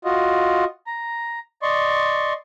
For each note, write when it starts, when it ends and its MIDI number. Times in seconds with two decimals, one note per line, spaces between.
0.05 0.65 65
0.05 0.65 66
0.05 0.65 75
0.87 1.39 82
1.62 2.33 74
1.62 2.33 75
1.62 2.33 84
1.62 2.33 85